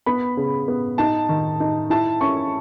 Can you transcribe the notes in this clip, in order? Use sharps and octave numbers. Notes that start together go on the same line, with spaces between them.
B3 B5
C#3
B3
D#4 A5
D#3
D#4
E4 A5
C#4 C#6